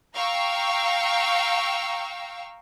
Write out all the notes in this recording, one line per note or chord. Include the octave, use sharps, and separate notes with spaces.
F5 G5 A#5 C#6 E6